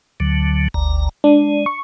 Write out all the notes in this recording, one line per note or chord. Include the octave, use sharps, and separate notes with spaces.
D2 D3 F#3
G1 D2 A#5
G#3 D4
C#6